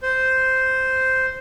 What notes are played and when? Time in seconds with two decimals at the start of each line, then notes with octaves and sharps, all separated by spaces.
0.03 C5